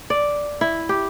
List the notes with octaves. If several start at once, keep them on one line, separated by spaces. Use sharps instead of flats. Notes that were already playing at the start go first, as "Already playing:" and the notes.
D5
E4
G4